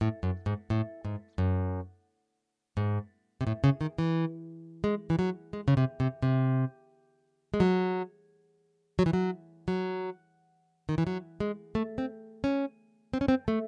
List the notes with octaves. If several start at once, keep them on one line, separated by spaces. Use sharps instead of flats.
A2
F#2
G#2
A2
G#2
F#2
G#2
C3
A2
C#3
D#3
E3
G#3
E3
F#3
G#3
C#3
C3
C3
C3
G#3
F#3
F#3
E3
F#3
F#3
D#3
E3
F#3
G#3
A3
C4
C#4
C4
C#4
C4
A3